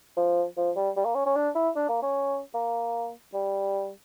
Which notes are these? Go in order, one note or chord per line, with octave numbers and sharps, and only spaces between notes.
F3
F3
G3
G3
A#3
C#4
C#4
D4
E4
D4
A#3
C#4
A#3
G3